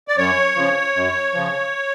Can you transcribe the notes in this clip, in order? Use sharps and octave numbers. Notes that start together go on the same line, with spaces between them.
D5
F#2 C#5
C#3 F3
F#2
C#3 F3